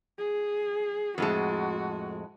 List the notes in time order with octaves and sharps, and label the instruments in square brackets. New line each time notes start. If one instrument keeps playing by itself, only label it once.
[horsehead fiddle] G#4
[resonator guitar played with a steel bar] F2 A2 G#3 [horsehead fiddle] F#4